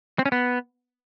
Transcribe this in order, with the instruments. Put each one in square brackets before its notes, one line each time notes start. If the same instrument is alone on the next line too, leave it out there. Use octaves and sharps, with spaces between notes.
[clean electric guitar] C4
C#4
B3